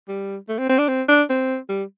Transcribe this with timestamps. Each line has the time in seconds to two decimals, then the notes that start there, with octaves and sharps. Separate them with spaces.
0.08 G3
0.49 A3
0.59 C4
0.69 C4
0.79 D4
0.88 C4
1.09 D4
1.30 C4
1.69 G3